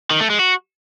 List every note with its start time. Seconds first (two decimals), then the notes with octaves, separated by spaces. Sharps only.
0.11 D#3
0.20 A3
0.30 G#3
0.39 F#4